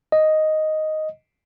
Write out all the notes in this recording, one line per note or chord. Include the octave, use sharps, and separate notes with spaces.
D#5